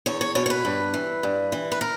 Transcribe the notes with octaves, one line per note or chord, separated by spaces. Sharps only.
E2 C#5
C#5
B2 C#5
C#5
B4
G2
E3
G2
E3
B4
A#4